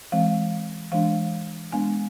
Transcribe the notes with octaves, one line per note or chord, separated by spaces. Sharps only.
E3 G#3 C4 F5
E3 G#3 D4 F5
G#3 B3 D4 G#5